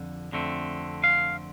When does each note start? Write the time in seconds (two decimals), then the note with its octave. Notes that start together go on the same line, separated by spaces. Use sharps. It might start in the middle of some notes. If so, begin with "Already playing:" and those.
Already playing: F2 D3
0.32 F2 D3 A3 C4
1.04 F5